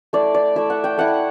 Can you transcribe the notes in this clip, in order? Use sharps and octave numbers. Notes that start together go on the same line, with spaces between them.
A3 E4 D5
D5
A3 E4 E5
F#5
G5
A3 E4 F#5